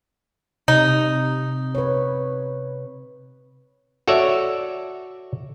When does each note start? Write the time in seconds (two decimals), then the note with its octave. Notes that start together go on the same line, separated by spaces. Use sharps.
0.68 C3 D#4
1.75 B4 C#5
4.08 F#4 A4 C#5 D5 E5